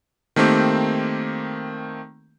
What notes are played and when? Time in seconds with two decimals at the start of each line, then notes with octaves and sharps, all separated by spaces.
0.36 D#3 A3 A#3 C4 G4